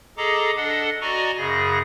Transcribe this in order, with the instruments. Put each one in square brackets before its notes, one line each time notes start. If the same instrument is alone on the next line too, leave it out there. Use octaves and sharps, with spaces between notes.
[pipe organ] G#4 A4 D#5 A#5 D6
D4 A4 D#5 F#5
F#4 D5 D#5 G#5 A#5 C#6
F#2 C#3 G#4 A#6